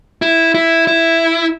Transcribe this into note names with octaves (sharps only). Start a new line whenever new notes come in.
E4
E4
E4